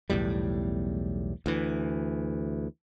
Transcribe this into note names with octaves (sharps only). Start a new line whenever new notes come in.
B1 E2 A2 G3
D2 E3